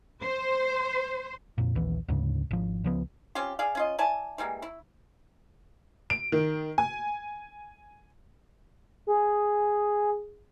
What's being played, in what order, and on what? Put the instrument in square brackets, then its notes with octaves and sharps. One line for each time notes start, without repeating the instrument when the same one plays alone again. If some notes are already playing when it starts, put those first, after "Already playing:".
[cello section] C5
[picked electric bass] F2 A#2
A#1 D#2 E3
D2 G#2 C#3
G#1 F3
C#2 F3 B3
[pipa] C4 C#4 F4 G4
G#4 D5 F5
C#4 F4 D#5
E4 D5 G#5 A5
E3 G3 G#3 A#3
E4
[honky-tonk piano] D7
D#3
G#5
[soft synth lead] G#4